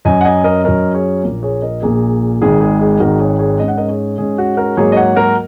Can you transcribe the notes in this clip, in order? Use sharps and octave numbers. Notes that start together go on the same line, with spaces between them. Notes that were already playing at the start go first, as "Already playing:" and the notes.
F#2 F#3 C#4 D#5 G#5
F#5
D#5 G#5
A#4 D#5
F#2 F#3 C#4 A#4 D#5
G#4 C#5
A#1 A#2 A#3
G#4 C#5
A#4 D#5
A#1 A#2 A#3 G#4
G#1 G#2 D#3 G#3 G#4
G#4
G#4
G#1 G#2 D#3 G#3 F#4 A#4
G#4 C#5
G#4 C#5
G#2 G#3 C#4 D#5
F#5
A#4 D#5
G#4 C#5
G#2 G#3 C#4 G#4
F#4
F#4 A#4
G#2 F#3 A#3 G#4 C#5
D#5
C#5 F#5
F#4 A#4